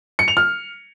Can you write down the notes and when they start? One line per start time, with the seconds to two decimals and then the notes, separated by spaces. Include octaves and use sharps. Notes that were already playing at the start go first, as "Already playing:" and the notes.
0.19 C#7
0.28 F7
0.37 F6